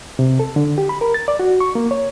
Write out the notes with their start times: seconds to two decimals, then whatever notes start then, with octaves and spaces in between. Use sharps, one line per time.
0.19 C3
0.40 A4
0.56 D3
0.78 G4
0.89 B5
1.01 A#4
1.14 A6
1.28 D5
1.40 F#4
1.60 C#6
1.75 A#3
1.91 C#5